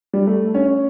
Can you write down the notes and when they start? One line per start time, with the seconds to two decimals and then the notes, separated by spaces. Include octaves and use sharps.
0.13 G3
0.27 A3
0.54 C#4